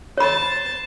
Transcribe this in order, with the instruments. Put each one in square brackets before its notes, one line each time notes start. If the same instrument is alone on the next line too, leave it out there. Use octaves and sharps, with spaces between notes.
[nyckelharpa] C5 A5 [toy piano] C#5 B5